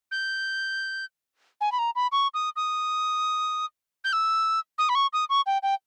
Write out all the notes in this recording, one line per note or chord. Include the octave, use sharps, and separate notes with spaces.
G6
G#5
B5
A#5
B5
C#6
D#6
D#6
G6
E6
D#6
B5
C#6
D#6
C#6
G5
G5